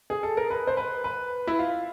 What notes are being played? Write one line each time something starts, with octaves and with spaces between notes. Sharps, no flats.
G#4
A4
A#4
B4
C5
B4
B4
E4
F4